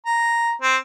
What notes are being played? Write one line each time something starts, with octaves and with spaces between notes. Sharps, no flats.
A#5
C4